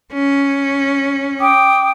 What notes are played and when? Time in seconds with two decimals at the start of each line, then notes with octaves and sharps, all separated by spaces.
0.13 C#4
1.40 G5 D6 D#6